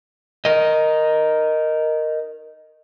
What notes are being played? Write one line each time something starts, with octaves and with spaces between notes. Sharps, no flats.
A#4 D#5